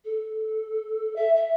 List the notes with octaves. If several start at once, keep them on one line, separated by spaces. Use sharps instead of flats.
A4
E5
E5